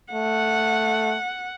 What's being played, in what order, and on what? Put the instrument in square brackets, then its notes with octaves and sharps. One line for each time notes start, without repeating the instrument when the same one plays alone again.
[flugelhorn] A3 [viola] F#5